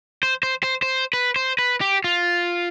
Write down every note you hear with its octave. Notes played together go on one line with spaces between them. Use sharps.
C5
C5
C5
C5
B4
C5
B4
G4
F4